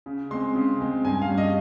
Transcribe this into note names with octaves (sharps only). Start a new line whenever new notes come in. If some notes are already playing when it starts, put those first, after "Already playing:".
C#3
G#3 C4 C6
C#3
G#3 C4
G2 G#5
F5
G3 C#4
D#5